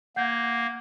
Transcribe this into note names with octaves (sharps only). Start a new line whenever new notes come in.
A#3 F#5 G6 G#6